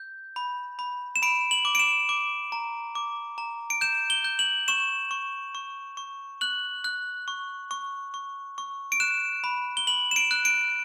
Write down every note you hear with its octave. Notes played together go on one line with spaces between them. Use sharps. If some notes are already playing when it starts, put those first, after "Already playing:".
Already playing: G6
B5
B5
E7
B5 D7
F#7
D6
D7
E7
D6
A#5
D6
A#5
D7
G6 E7
G7
G6
F#7
C#6 E7
C#6
C#6
C#6
F#6 F#7
F#6
C#6
C#6
C#6
C#6
D7
F#6 E7
B5
G7
B5 F#7
E7
D7
F#6
D7